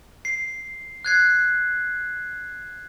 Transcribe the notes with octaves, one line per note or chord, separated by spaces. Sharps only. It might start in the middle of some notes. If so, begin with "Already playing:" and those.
C7
F#6 G#6 C7